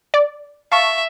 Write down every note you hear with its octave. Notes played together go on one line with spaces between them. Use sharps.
D5
E5 F5 A5 C#6